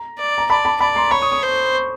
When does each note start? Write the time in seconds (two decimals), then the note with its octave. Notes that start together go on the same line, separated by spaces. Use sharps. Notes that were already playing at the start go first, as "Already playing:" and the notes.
Already playing: A#5
0.18 D5
0.38 A#5
0.50 D5 A5 B5
0.65 A5 B5
0.80 D5 A5 B5
0.96 A#5 C6
1.11 C#5 B5 C#6
1.22 C#6 D#6
1.32 C#6 D#6
1.43 C5